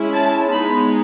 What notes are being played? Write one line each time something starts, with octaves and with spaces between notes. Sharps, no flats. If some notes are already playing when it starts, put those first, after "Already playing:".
Already playing: G#3 C#4 E4
A5
G#3 B3 D#4 B5